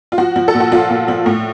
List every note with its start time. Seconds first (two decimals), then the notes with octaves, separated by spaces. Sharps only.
0.12 F4
0.18 F3 F#4
0.36 F3
0.48 A4
0.54 A#2
0.60 F#4
0.72 F3 F4
0.90 A#2
1.08 F3
1.26 A2